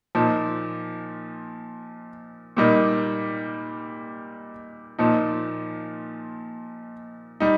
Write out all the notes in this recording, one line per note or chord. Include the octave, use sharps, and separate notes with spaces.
A#2 F3 D#4
A#2 G3 A#3 D#4
A#2 F3 D#4
G3 D#4